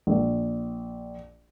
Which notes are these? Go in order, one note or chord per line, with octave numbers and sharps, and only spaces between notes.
A#1